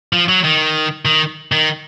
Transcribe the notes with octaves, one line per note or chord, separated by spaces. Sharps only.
F3
F#3
D#3
D#3
D#3